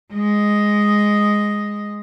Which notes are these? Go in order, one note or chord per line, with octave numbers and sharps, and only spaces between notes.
G#3 D#5